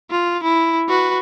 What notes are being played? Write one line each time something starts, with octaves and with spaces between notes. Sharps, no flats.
F4
E4
F#4 B4